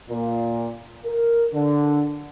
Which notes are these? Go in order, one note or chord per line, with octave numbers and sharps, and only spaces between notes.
A#2
A#4
D3